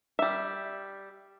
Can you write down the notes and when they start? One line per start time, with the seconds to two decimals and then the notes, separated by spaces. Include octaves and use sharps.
0.19 G3 E5